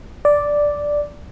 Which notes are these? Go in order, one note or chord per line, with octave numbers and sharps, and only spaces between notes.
D5